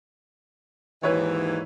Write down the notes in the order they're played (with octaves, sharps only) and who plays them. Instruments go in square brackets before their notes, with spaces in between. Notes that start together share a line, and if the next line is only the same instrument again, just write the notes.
[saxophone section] D#2 G#2 E3 [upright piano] E4 B4 C#5